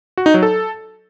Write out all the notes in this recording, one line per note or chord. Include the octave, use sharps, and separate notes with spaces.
F#4
D#4
F#3
A4